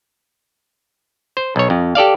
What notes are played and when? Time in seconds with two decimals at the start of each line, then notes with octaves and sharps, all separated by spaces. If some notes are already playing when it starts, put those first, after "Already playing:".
1.37 C5
1.56 B1 C#5
1.70 F2
1.95 G4 A4 D5 F5